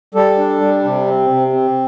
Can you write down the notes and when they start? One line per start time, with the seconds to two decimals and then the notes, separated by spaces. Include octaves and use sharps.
0.14 G3 A4
0.38 D4
0.61 G3
0.84 C3
1.07 C4
1.30 C3
1.53 C4